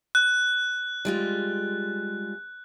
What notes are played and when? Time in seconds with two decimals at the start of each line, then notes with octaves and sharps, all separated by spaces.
0.15 F#6
1.05 G3 G#3 F4